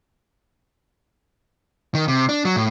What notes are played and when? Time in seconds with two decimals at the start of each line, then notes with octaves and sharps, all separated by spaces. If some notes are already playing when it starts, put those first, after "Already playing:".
1.95 D#3
2.08 C3
2.29 D4
2.45 F#3
2.56 A2